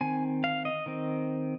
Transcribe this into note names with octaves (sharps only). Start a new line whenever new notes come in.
D#3 C4 G#5
F5
D#5
D#3 C4